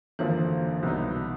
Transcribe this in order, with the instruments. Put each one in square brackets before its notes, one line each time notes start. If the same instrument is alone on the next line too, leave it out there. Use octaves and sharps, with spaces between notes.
[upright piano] G#1 F#2 D3 F3 A#3 [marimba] E3
[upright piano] C2 B2 F#3 B3 D#4